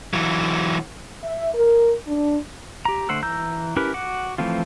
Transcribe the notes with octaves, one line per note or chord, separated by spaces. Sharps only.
E3 F#3
E5
A#4
D4
G4 A#5
D3 A3 C5 F#5 E6
E3 A#5 E6 G6
C#4 E4 G4 A#4 B4
F#4 F#5 D6
E3 F3 A3 C4 F4